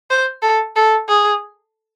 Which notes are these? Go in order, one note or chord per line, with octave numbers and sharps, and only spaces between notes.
C5
A4
A4
G#4